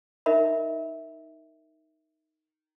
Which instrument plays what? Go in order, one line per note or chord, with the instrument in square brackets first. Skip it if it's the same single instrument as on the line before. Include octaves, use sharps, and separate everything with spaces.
[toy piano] D#4 A#4 D#5 E5 B5